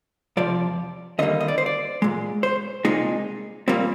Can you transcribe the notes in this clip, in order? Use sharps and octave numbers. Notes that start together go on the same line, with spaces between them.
F2 C3 F3 D5
D#2 D3 G3 A#3 D#5
D#5
D5
C5
D5
A#2 G#3
C5
C2 A#2 G#3 D#4
A#2 G3 A#3 C4